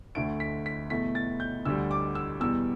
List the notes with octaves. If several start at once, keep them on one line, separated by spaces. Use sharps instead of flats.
D2 D3 A3 D7
B6
B6
E2 B2 A3 B6
A6
G6
D2 D3 G3 E6
D6
E6
E2 B2 G3 E6